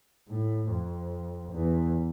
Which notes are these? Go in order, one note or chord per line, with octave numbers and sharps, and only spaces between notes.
A2
F2
E2